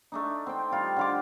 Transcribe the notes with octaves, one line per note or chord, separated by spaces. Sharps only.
A3 D4 D#4
C4 G5
G3 F4
D3 F4 D6